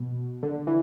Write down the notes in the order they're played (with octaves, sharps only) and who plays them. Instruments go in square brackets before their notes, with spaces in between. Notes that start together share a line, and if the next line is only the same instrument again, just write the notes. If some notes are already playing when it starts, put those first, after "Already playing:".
Already playing: [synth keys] B2
D3
E3